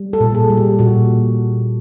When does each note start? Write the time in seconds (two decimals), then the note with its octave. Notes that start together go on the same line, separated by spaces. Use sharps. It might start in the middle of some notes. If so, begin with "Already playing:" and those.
Already playing: G3
0.13 A4
0.21 A#2
0.35 G#4
0.50 G3
0.57 G4
0.79 A#2 F#4